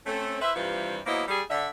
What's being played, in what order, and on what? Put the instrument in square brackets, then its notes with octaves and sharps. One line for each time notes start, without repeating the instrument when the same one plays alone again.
[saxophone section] A3 C4 C#4
E4 B4 C5 E5
G2 C3 E3 G3 F4 B4
F#3 A#3 B3 E4 C5 D#5
G3 G#4
D3 E5